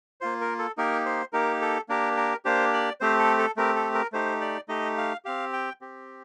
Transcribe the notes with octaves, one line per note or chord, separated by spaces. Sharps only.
A#3 F4 C5
A#4
A4
A#3 D#4 G4 A#4
C5
A#3 D#4 G4 A#4
A4
A#3 D4 G4 A#4
A#4
A#3 D4 G4 C5
D5
A3 C4 G4 C5
A4
A4
A3 C4 G4 A#4
A4
A#4
A3 D#4 G4 C5
D5
A3 D#4 G4 D#5
F5
C4 G4 F5
G5
C4 G4